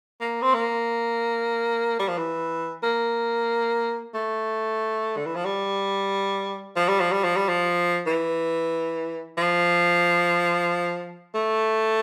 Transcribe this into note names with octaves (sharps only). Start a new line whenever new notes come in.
A#3
C4
A#3
G3
F3
E3
A#3
A3
D3
E3
F3
G3
F3
G3
F3
G3
F3
G3
F3
E3
F3
A3